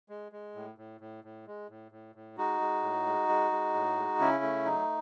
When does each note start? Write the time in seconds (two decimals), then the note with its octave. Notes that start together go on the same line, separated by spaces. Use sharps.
0.09 G#3
0.32 G#3
0.55 A2
0.78 A2
1.01 A2
1.24 A2
1.47 G#3
1.70 A2
1.92 A2
2.15 A2
2.37 G#3 D#4 F#4
2.61 G#3
2.83 A2
3.06 G#3
3.29 G#3
3.52 G#3
3.74 A2
3.97 G#3
4.19 C#3 C#4 E4
4.43 A3
4.65 F#3 D#4